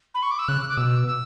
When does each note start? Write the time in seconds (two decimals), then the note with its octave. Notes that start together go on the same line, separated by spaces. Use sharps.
0.14 B5
0.23 C#6
0.31 D6
0.39 E6
0.48 C#3 F#6
0.69 D6
0.77 B2 E6
1.07 E6